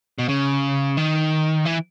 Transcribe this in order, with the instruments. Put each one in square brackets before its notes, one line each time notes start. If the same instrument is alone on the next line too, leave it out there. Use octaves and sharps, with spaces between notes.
[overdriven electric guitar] B2
C#3
D#3
E3